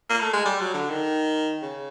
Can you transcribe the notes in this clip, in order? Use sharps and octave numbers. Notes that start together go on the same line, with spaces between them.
A#3
A3
G#3
G3
F#3
D3
D#3
C#3